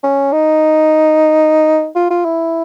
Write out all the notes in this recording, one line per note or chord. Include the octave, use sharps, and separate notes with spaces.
C#4
D#4
F4
F4
E4